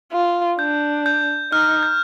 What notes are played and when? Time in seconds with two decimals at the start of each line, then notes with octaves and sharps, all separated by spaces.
0.12 F4
0.59 D4 G6
1.06 G6
1.52 D#4 F6
1.83 G6